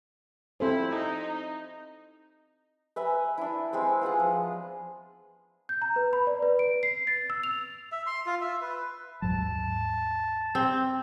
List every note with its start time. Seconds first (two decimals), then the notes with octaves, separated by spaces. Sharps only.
0.60 C4 E4 A4 C5
0.93 D#4
2.96 B4 E5 G#5 A#5
3.38 D4 E4
3.73 G#3 C4 C5
4.01 B3 F4 G#4 F#5
4.19 F3
5.69 G6
5.82 A#5
5.96 B4
6.13 B5
6.27 D5
6.43 B4
6.59 D7
6.83 C7
7.07 A6
7.30 E6
7.43 F7
7.92 E5
8.06 C6
8.26 F4
8.41 E5
8.61 B4
9.22 D#2 G#2 F#3 A5
10.55 C4